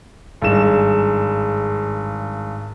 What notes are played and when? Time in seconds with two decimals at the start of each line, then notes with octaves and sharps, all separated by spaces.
0.42 G#1 G2 G#3 E7